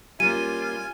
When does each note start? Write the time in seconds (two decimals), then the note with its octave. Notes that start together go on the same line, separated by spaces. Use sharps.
0.20 G3 A#3 C#4 F4 G#5 D#7